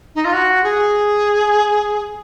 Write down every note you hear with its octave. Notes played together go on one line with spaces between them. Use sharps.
D#4
F4
F#4
G#4